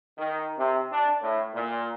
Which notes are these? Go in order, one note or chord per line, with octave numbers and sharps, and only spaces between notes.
D#3
C3
D4
A2
A#2